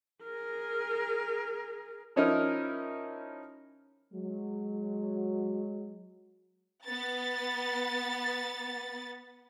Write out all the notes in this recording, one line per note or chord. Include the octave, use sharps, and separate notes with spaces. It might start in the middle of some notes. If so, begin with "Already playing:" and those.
G#4 A#4
F3 C#4 D#4 E4 A#4
F#3 G#3
B3 A6